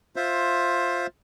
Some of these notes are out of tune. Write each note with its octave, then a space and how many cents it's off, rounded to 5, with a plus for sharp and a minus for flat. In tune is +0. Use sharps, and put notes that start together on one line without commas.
F4 +10 C5 +15 E5 +0